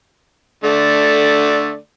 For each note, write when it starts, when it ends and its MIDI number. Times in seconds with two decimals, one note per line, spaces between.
0.64 1.78 50
0.64 1.78 57
0.64 1.78 74